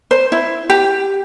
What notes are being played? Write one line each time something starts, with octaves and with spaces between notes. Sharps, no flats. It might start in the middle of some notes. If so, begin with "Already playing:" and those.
C5
E4
G4